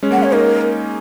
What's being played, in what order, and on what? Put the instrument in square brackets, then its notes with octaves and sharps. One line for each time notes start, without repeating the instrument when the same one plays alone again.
[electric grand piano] G#3 C#4
[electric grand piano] A#3 [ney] F#5
[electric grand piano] G#3 C#4
[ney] C#5
[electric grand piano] A#3 D#4 [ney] A#4